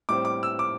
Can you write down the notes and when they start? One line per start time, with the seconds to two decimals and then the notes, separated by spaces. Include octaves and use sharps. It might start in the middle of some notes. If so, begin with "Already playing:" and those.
0.09 A2 G3 C4 D6
0.25 D6
0.43 E6
0.59 D6